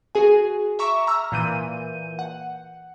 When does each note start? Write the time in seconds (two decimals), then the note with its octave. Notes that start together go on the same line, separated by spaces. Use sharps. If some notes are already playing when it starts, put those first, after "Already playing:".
0.15 F#4 G#4 G#5
0.79 E5 A#5 C#6 D6 E7
1.07 A#5 E6 F6
1.32 A#2 E3 G6 D#7
2.19 F#5